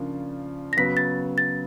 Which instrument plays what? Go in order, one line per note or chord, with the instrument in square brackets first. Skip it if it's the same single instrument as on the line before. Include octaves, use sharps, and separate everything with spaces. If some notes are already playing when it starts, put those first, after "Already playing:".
Already playing: [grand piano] C#3 F3 A#3 D4
[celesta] A#6
[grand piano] C#3 F#3 B3 [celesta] B6
[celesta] A6
A6